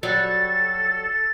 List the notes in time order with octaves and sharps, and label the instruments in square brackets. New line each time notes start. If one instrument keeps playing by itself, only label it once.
[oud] F#3 G3 [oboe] A4 [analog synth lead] A6